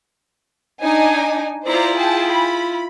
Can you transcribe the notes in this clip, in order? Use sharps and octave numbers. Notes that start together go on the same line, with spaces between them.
D4 D#4 G#5
E4 F4 C5 D5 A#5
G#4 G5 A5
B5